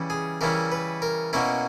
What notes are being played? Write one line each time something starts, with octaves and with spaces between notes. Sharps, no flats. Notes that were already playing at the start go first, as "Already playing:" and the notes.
Already playing: C#3 E3 G3 C#4 E4
G#4
C#3 E3 G3 C#4 E4 A#4
B4
A#4
B2 A#3 C#4 E4 A#4